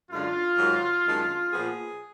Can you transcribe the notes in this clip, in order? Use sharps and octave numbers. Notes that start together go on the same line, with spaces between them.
F#2 D3 G#3 D4 F4
G#2 D#3 F#3
F#2 D#3 G#3 D4
A#2 F3 B3 G#4